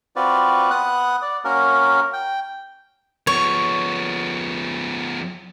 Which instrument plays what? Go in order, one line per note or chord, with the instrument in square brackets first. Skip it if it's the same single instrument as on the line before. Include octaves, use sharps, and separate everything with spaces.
[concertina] C4 F4 F#4 B4 D5
B3 F#5 D#6 F#6
D5
A#3 C#4 F#4 A#4
G5
[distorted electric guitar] F3 B3 [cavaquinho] C#5